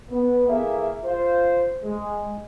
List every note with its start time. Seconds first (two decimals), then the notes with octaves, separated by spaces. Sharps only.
0.10 B3
0.48 E3 A#3 G#4 A4 E5
1.03 F4 C5
1.83 G#3